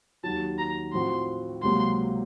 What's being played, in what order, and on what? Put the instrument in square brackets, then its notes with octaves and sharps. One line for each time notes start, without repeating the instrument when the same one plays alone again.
[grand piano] D#2 D#3 F#3 [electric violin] A5
[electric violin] A#5
[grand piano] A2 F3 C4 F#4 [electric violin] C6
[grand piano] C#2 C3 F#3 A#3 [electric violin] C6